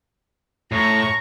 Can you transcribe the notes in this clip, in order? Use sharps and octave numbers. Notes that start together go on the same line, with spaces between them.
A2 A#5 C#6